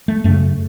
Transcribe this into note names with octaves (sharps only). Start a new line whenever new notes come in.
A3
F#2 C#3 A3